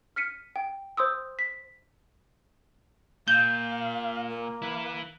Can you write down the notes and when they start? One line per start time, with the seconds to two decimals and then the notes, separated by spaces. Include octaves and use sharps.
0.16 F6 B6 C#7 D#7
0.56 G5
0.97 C5 C6 D#6 E6
1.39 B6
3.28 A#2 F5 G6
4.28 A#3
4.62 E4 B4